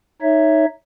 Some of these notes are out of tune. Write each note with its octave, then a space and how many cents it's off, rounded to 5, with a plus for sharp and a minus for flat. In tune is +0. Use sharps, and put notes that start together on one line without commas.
D#4 +0 C#5 +0 E5 +0